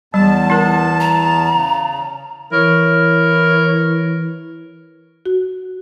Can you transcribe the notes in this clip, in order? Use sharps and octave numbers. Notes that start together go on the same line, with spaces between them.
E2 G3 A5
E4 A#4
A#5
C#3
E3 E4 A#4 C#5
F#4